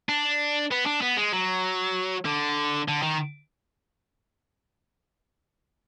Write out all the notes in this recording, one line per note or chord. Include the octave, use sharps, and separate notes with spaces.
D4
B3
D4
B3
G#3
F#3
D3
D3
D#3